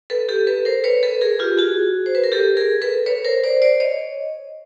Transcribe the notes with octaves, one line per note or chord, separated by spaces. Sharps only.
A4 B4
G4 A4
A4 B4
A#4 C5
B4 C#5
A4 B4
G#4 A#4
F4 G4
F#4 G#4
C5
B4
A#4
G4 A4
G#4 A#4
A4 B4
B4 C#5
A#4 C5
C5 D5
C5 D5
C#5 D#5